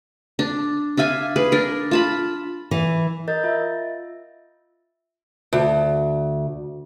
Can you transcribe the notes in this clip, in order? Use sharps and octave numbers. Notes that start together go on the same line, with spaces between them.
D4
D4 E5 F5 G#5
G#4 B4
D4 A#4
F4 A5 B5
E3
A#4 D#5 G6 A6
F4 E5
D2